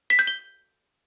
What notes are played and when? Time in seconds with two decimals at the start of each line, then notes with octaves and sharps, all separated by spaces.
0.10 B6
0.19 G6
0.27 G7